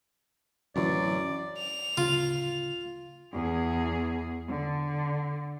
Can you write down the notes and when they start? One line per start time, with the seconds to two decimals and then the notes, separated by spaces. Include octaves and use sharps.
0.76 D1 F#2 E3 F#3 D5
1.58 F7
1.97 D1 C#3 F4
3.33 E2 G#4
4.49 D3